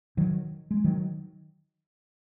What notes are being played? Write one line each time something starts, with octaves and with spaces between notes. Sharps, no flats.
D#3 F#3
G#3
D#3 F#3